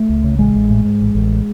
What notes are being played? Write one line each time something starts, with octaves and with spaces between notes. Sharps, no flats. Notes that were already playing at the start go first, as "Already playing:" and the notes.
Already playing: A3
C#2
C#3
A1 G#3
A1
A2
G#2
A1
A1